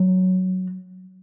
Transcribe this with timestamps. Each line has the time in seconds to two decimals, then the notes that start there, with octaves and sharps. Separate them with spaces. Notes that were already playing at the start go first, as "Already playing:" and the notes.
Already playing: F#3